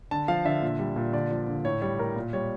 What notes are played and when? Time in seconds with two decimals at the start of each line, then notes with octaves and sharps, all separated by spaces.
0.11 D3 A5
0.28 F3 F5
0.45 D3 E5
0.62 A#2
0.79 G3
0.96 A#2
1.13 D3 D5
1.31 F3
1.48 D3
1.65 A2 C#5
1.82 G3 C#5
1.99 A2 A#4
2.16 A#2
2.33 G3 C#5